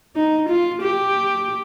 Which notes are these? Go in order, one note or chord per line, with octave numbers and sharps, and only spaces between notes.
D#4
F4
G4